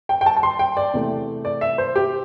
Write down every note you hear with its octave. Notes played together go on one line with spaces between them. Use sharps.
G5
G5
A5
A5
C6
G5
D5
E2 C3 A3
D5
E5
C5
G4